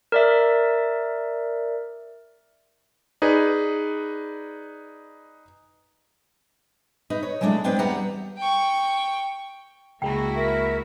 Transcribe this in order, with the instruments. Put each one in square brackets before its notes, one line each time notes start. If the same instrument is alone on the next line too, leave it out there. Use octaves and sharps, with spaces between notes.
[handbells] A#4 D5 E5
[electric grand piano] D#4 G#4 B4 D5
[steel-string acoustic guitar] D#4 B4
C#5
F#3 G#3 A3 D4 E4
B3 C4 D4 B4 G5
E2 G3 G4 B4 F#5 A#5
[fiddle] G5 C#6
[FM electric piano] C#2 G#3 [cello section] A#3 E4 F#4 [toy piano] G5 A5
[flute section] A#4 E5